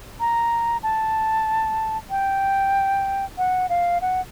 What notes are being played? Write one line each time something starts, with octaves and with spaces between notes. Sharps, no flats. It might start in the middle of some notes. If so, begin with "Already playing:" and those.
A#5
A5
G5
F#5
F5
F#5